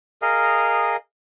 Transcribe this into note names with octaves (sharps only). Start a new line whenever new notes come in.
G#4 A#4 D#5 F5